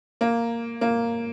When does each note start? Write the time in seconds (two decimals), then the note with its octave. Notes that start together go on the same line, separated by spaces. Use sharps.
0.21 A#3
0.81 A#3